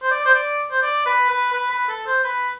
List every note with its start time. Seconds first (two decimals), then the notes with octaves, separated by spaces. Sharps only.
0.02 C5
0.11 D5
0.26 C5
0.34 D5
0.71 C5
0.82 D5
1.06 B4
1.29 B4
1.53 B4
1.71 B4
1.88 A4
2.07 C5
2.24 B4